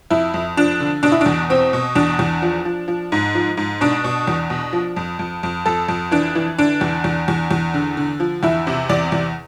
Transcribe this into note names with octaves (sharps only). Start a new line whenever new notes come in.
F2 E4
F2
F3 D4
D3
B2 D4
E4
D4
E2
B2 C4
B2
E2 D4
E2
F3
F3
F3
G#2
F3
G#2
B2 D4
B2
E2
B2
F3
F2
F2
F2
F2 A4
F2
E3 D4
E3
D3 D4
E2
E2
E2
E2
D3
D3
F3
E2 E4
C3
E2 D5
E2